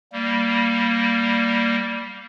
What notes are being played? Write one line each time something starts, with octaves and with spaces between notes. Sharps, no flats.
G3 A#3